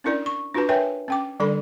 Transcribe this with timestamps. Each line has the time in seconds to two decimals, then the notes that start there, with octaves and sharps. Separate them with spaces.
0.04 C#4 D4 E4 A#4 D5
0.26 C#6
0.54 D4 F4 F#4 B4 A5
0.69 A#4 B4 C#5 E5 G5 G#5
1.08 C#4 G5 D6
1.40 D3 G3 D4 A4 D5 B5